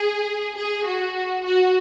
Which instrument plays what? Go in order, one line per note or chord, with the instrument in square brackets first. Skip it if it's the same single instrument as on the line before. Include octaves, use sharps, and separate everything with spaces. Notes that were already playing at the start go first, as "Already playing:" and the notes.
Already playing: [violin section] G#4
G#4
F#4
F#4